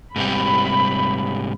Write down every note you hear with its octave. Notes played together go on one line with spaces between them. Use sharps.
G#2 C3 G3 B5